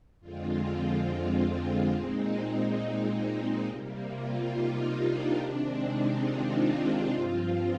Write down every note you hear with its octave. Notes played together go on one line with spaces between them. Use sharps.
F2 D3 G#3 C4 F4
A#2 G#3 C4 D#4
C3 G3 A#3
F4
D#4
D4
C3 D#3 G#3 C4
D#4
F4
D#4
G2 F3 C4 F4